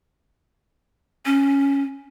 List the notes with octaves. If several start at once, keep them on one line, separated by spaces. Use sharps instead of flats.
C#4